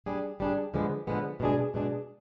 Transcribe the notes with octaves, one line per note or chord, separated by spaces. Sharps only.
G3 D4 G#4
G3 D4 G#4
D3 F3 G#3 B3
D3 F3 G#3 B3
B2 G#3 D4 G#4
B2 G#3 D4 G#4